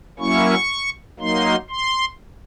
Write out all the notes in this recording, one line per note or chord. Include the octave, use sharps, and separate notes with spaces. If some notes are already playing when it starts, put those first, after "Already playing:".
F#3 A#3 C#4 E4 C#6
F#3 A#3 D#4 C6
C6